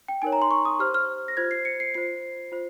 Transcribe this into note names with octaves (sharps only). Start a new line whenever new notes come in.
G5
D#4 A#4 C#5 G#5
A#5
C6
C#6
D#6
G4 C5 F6
F6
A#6
F4 C5 G#6
C7
C#7
C7
F4 C5 C7
F4 C5